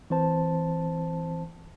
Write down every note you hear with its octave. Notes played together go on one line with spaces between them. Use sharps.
E3 C4 C5 A5